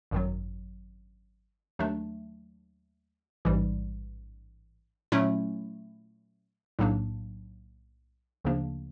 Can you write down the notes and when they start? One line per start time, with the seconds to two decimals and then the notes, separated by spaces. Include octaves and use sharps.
0.11 G#1 F#2 D#3 F#3
1.79 D#2 D#3 F#3 A3 D4
3.45 A1 G#2 E3 G3
5.12 A#2 F#3 A3 C#4 E4
6.79 B1 A2 F#3 A#3 D4
8.44 D2 C#3 F3 A#3 D4